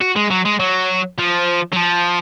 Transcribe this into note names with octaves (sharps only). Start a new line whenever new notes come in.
F#4
G#3
F#3
G#3
F#3
F3
F#3
F3